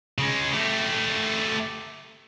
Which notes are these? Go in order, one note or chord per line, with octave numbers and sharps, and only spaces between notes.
C#3 G#3
A3 G4